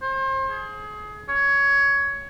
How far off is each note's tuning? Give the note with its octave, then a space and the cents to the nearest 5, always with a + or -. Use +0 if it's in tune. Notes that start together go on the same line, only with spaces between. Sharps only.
C5 +35
G#4 +25
C#5 +15